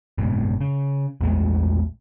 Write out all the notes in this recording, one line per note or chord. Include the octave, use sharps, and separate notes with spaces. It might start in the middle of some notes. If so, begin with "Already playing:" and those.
F#1 G#2 B2
C#3
A#1 E2 G#3 A3